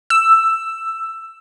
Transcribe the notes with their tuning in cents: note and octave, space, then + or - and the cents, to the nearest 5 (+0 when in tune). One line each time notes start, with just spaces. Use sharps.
E6 +10